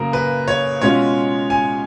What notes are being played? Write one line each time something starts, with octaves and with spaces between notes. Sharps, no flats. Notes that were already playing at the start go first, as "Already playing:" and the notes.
Already playing: F#2 C#3 F#3 A#3 A#4
B4
C#5
B2 G#3 C#4 F4 C#5
G#5